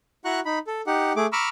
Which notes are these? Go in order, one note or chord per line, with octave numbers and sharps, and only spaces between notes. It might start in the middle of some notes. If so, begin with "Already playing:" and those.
E4 F#4 F#5 A#5 C#6 F#6
D#4 B5
A4
D#4 G4 F#5
A3 G#4 D6
A#5 B5 C#6 D6 E6 F6